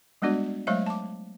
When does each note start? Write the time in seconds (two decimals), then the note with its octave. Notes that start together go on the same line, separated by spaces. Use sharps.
0.22 G3 G#3 B3 D4 F#4 D5
0.67 F#3 G#3 A3 C5 E5 F5
0.86 A5 D6